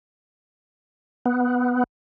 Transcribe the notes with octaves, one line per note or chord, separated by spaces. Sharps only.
B3